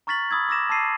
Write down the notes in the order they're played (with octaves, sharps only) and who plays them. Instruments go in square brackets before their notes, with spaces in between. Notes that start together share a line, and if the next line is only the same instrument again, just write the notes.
[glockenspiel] A#5 C#6 F6 A6 B6 F#7
B5 D#6 E6 G#6
D6 E6 A#6 E7
A5 D6 E6 A6 C7 D#7